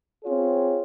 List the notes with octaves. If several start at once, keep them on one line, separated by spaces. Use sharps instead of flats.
C4 F4 G#4 C#5